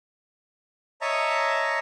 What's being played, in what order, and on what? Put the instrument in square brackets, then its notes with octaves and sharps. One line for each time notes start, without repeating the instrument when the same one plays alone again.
[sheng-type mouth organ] C#5 D#5 E5 A5 A#5